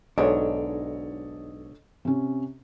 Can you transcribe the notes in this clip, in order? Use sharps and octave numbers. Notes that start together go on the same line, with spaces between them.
B1 G#2 D4 A4 C#5 D#5
C3 C#4